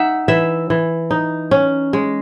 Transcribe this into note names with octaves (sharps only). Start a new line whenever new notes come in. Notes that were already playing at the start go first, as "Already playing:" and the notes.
Already playing: D#4 E5 F#5
E3 E5
E3
D#4
C#4
G#3